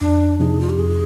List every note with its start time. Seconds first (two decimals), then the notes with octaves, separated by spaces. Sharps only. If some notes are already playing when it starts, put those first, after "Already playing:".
0.01 F2 D4
0.40 C3 F3 C4 D#4 G#4
0.61 F4
0.70 G4
0.79 F2 G#4